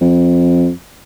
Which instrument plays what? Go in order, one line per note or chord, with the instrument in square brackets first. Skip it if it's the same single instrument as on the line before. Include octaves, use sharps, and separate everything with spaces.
[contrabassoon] F2